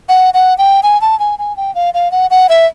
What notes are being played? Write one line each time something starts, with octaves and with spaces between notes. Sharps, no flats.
F#5
F#5
G5
G#5
A5
G#5
G#5
G5
F5
F5
F#5
F#5
E5